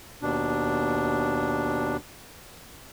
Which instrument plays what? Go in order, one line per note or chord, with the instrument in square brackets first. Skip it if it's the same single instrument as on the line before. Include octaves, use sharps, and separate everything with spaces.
[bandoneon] D#2 B2 D4